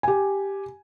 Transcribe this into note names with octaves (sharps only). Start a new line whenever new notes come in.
G4 G#5